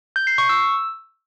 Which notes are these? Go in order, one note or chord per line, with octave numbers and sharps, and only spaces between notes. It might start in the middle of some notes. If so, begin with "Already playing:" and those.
G6
C7
C#6
E6